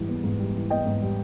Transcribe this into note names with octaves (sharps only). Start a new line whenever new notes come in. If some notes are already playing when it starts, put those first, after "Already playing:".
Already playing: G#2 E3 G3
B3
G#2
G3
E3
B3 D#5 G5
G#2
G3